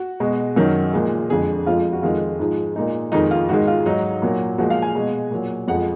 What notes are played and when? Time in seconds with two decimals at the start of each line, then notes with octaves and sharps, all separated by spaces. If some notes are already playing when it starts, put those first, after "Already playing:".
Already playing: F#4
0.20 B2 G#3
0.56 F#2 D#3 F#3
0.93 A#2 F3 G#3
1.29 F2 D3 G#3 G#4
1.66 F2 F3 G#3 F4
1.93 F#4
2.02 F2 D#3 G#3 F4
2.39 G#2 F3 G#3
2.76 A#2 G#3 D#4
3.12 F2 D#3 G#3 D#4
3.31 F4
3.49 G#2 D#3 G#3 F#4
3.67 F4
3.86 G#2 F#3 D#4
4.22 A#2 F#3
4.58 A#2 F3 G#3 F#4
4.70 F5
4.82 G#5
4.95 B2 G#3
5.31 A#2 F#3
5.68 F2 F3 G#3 F#5